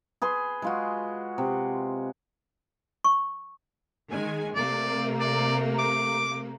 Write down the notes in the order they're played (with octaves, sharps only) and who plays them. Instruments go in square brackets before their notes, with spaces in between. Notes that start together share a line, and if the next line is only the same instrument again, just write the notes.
[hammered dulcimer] G#4 B4 C6
G#3 F4 F#4
C3
[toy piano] C#6
[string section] D#3 G#3 G#5
[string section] C3 A3 A#3 [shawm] D5
[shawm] D5
D6